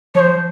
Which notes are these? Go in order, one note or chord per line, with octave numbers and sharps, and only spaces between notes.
F3 C5 C#5